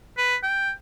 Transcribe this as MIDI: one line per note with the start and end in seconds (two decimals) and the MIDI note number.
0.18 0.36 71
0.43 0.71 79